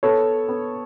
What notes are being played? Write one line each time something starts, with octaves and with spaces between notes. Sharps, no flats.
B3 A4 C#5
B3